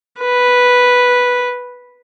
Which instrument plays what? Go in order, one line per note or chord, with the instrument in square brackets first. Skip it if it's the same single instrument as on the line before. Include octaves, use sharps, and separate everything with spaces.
[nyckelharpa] B4